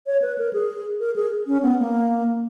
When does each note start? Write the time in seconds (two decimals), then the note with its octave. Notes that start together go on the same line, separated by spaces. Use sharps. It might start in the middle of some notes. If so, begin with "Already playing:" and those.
0.07 C#5
0.22 B4
0.38 A#4
0.53 G#4
1.00 A#4
1.16 G#4
1.47 C#4
1.63 B3
1.79 A#3